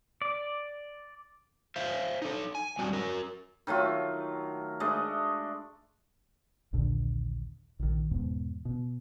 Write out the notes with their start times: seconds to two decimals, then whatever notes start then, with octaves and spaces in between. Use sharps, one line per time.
0.22 D5
1.76 C5 E5 F5
2.22 D#4 A4
2.55 G#5
2.79 G3 C4 D4 F#4
2.93 F#4 A#4
3.67 D#3 F#3 A3 F4
4.80 G#3 A3 D4 D#5
6.73 A#1 D#2 A#2 D3
7.79 A#1 D3 D#3
8.11 E2 G#2 B2
8.65 B2